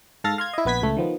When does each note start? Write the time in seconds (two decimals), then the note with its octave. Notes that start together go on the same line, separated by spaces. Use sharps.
0.24 G#2 A4 F5 F6 A6 A#6
0.38 F5 C6 G#6
0.53 E4 D#5
0.65 A#1 B3 B4 G#6 B6
0.82 C#2 A3
0.97 D#3 F3 B3